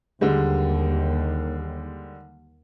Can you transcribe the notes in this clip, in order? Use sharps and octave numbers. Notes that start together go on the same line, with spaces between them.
D#2 D3 G3 G#3